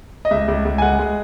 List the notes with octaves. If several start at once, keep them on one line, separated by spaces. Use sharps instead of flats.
D#5
C#2 E5
C#2
C#2
G#5
G#3 F#5
G#3